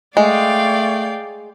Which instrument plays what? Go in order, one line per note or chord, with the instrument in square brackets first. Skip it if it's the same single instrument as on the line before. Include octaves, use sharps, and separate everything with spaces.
[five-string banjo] G#3 [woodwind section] A3 [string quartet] D5 F5 G5